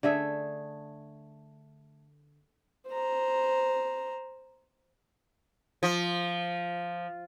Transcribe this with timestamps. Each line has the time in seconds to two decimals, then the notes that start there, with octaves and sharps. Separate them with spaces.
0.03 D3 A3 G#4 E5
2.88 C5 A#5
5.83 F3